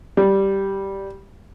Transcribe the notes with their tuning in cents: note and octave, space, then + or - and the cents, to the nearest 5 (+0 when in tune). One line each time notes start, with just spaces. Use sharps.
G3 -5